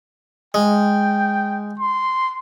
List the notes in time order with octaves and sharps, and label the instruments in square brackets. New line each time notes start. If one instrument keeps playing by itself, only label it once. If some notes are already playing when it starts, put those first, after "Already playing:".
[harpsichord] G#3 [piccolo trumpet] G5
[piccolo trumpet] C6